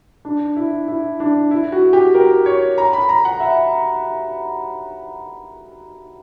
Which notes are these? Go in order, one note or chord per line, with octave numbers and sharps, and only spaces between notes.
D4
E4
E4
D4
E4
F#4
G4
A#4
C#5
A#5
B5
A#5
F#5
E5